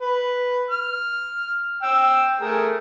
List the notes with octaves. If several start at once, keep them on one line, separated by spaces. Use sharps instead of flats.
B4
F6
G5 E6
A3 G#4 A#4